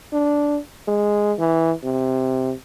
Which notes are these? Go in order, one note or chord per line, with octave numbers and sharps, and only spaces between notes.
D4
G#3
E3
C3